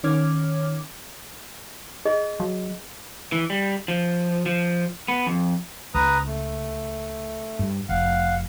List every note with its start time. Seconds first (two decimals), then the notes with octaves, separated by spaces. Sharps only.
0.04 D#3 C#4 C#5 D6 F6 G#6
2.05 G#4 D#5
2.40 F#3
3.32 E3
3.50 G3
3.88 F3
4.46 F3
5.08 B3
5.27 F2
5.94 C#2 B4 A#5 D#6
6.26 A3
7.59 G2
7.89 F1 F5 F#5